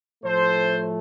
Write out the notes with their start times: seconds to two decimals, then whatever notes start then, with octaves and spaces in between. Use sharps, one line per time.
0.24 A2 F3 A3 A4 C5